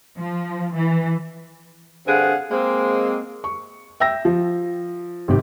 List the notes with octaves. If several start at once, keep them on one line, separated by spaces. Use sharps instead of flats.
F3
E3
G2 D3 C4 G#4 F5 F#5
G#3 A#3 C4
C#6
E5 G5 E6 A#6
F3
G#1 C3 G4